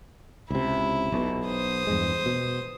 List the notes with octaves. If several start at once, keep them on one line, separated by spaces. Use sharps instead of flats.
C#2 C3 E4
B1 B2
C5 D#6
E2 G2 G#3
B2